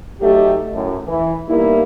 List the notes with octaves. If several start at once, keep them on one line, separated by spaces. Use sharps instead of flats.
F#3 A3 D#4 G4
F#2 A2
E3
G3 A#3 B3 D#4 E4